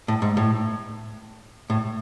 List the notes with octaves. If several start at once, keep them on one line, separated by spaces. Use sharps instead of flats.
A2
G#2
A2
A2